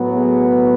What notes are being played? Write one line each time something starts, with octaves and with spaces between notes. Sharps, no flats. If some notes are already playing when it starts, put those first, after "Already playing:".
Already playing: A2 F#3 B3
G#4
B4